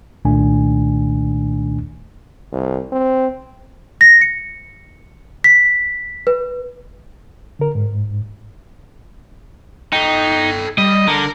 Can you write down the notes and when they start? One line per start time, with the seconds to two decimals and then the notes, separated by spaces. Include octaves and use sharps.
0.25 C2 A#2 D#3 A3 D4 G#5
2.52 C2
2.92 C4
4.01 A#6
4.21 C#7
5.44 B6
6.27 B4
7.59 D3 A#4
7.75 G#2
9.93 D#4 A4 G5
10.78 G3 D#5
11.08 D3 A#4 A#5